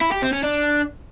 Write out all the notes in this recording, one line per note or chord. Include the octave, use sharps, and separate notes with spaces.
E4
G4
C4
C#4
D4